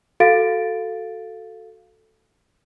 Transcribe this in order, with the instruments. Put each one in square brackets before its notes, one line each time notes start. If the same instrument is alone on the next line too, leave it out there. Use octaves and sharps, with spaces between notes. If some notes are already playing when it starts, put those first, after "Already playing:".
[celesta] F#4 A4 F5 A6 D7